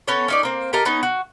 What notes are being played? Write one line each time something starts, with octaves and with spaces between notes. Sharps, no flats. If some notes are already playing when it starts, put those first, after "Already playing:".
B3 C#4 A4 C#5
C#4 D#4 D5
A#3 C4
G4 A4 A#4 D#5
B3 C#4 D#4
F#4